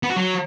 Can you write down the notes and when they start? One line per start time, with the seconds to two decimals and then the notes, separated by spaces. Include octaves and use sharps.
0.03 B3
0.10 F#4
0.16 F#3